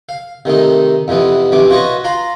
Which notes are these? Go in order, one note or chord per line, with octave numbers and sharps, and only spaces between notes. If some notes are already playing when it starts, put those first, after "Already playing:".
F5
C3 D#3 A3 D#4
F2 C3 E3 B3
B1 C3 E3 C#4 D6
F4 F#4 B4 C#5 D#5
F4 F5 A#5 B5